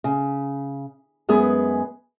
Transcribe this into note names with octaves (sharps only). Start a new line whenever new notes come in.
C#3
F#2 G#3 B3 G#4 B4